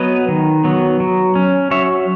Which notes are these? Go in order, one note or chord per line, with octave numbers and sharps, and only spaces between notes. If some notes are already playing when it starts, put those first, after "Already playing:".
Already playing: F#3 B3 B4 D#5
D#3
F#3 B3
F#3
C#4
F#3 C#5 E5